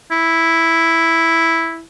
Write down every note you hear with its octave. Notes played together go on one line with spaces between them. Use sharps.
E4